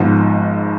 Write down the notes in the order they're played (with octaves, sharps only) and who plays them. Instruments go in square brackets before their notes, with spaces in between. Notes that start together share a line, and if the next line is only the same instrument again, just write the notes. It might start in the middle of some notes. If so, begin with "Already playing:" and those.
Already playing: [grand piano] G#1 G#2 F3 B3